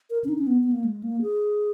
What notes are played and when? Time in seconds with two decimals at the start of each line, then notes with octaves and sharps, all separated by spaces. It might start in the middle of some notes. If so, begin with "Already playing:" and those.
0.10 A#4
0.24 C#4
0.29 D#4
0.38 C#4
0.47 B3
0.63 B3
0.72 A#3
0.84 G#3
1.03 A#3
1.22 G#4